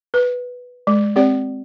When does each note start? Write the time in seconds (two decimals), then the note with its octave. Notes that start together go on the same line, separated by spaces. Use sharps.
0.14 B4
0.87 G#3
1.16 C4 G4 D5